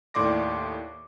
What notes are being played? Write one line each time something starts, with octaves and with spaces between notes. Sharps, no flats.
D#2 A2 D5 C6 D6 A#6